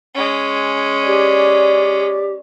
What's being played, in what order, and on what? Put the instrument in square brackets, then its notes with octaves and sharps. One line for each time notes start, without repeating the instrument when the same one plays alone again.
[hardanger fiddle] G#3 C#4
[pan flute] G4 [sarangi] D5